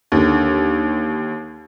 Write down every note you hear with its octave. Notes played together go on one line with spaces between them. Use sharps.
D#2 D3